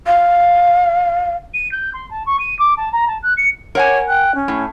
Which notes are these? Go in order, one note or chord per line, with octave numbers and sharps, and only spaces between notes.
F5
D#7
G6
C6
A5
C#6
D#7
D6
A5
A#5
A5
F#6
C#7
G4 A#4 C#5 F#5 G#5
G5 F#6
C#4
A2